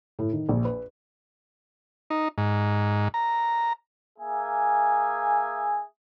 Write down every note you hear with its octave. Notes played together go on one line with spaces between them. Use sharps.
A2
D#3
A#1
B4
D#4
G#2
A#5
A#3 G#4 E5 G#5